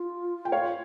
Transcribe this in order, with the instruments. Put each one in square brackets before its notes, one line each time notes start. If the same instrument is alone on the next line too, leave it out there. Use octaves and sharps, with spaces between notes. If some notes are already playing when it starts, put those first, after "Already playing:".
Already playing: [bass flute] F4
[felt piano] G5
C#5 F5